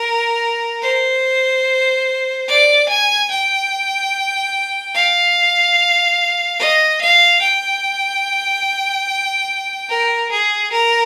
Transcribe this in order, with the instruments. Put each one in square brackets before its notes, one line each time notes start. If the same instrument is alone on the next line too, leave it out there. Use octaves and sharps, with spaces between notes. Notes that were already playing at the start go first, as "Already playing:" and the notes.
Already playing: [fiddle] A#4
C5
D5
G#5
G5
F5
D#5
F5
G5
A#4
G#4
A#4